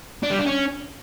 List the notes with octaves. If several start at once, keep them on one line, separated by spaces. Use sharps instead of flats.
D4
G3
D4
C#4